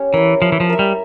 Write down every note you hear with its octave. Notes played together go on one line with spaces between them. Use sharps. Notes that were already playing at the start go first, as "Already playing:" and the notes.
Already playing: A#3 C#4 G4
E3 E4 A#4
F3 E4
E3
F3
A#4 E5
G3